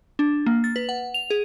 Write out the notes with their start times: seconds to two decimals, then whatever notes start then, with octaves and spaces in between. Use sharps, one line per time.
0.19 D4
0.46 A#3
0.64 A6
0.76 B4
0.89 F#5
1.14 F7
1.30 G#4